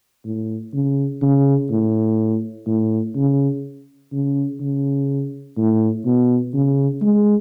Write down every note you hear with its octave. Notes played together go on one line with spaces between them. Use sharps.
A2
C#3
C#3
A2
A2
C#3
C#3
C#3
A2
B2
C#3
G#3